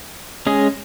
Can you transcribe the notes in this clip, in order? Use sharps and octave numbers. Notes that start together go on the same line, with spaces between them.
G#3 C#4 G#4 D#5